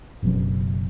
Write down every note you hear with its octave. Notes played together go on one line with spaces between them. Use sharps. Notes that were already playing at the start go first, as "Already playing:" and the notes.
F#1 B2 F#3